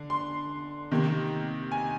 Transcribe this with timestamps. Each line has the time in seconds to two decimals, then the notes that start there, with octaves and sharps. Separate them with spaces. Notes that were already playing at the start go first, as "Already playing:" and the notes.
Already playing: D3
0.10 C6
0.91 C3 D#3 A#3
1.72 G#5